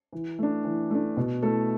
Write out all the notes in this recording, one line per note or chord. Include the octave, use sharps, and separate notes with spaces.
E3
A3 D4
E3
A3 D4
B2
A3 E4 A4